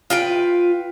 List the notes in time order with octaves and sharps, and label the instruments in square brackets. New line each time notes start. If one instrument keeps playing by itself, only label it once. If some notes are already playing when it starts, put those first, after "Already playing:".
[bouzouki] F4 B4 G5